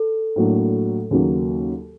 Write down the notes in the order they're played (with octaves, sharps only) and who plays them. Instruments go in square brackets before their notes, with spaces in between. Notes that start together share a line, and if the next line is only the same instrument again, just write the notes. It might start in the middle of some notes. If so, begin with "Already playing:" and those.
Already playing: [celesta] A4
[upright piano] A2 F#3 A#3 D4
D#2 C#3 F#3 A#3